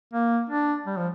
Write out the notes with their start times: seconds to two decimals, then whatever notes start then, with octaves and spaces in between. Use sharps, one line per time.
0.13 A#3
0.50 D4
0.86 G3
0.97 F3